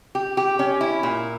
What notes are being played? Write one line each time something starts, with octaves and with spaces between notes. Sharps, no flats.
G4
G4
C#4
E4
A#2